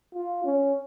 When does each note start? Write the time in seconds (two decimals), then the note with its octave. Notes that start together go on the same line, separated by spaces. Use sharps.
0.14 F4
0.45 C#4